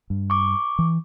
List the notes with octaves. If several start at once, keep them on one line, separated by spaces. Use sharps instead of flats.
G2
C#6 D6
E3